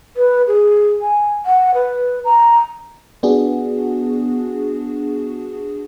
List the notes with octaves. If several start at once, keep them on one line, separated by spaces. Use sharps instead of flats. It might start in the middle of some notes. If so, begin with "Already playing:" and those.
B4
G#4
G#5
F#5
B4
A#5
B3 D4 F#4 G#4